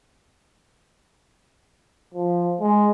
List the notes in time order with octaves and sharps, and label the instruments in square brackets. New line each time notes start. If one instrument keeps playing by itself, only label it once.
[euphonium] F3
G#3